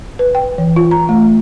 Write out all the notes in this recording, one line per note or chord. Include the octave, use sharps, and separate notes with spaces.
B4
G5
E3
F4
A#5
A3